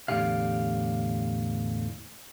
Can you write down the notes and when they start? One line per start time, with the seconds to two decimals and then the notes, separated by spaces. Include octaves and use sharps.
0.08 E2 A2 D3 G4 F5